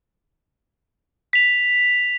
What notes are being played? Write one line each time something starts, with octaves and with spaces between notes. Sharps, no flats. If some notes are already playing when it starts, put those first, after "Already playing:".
B6 F7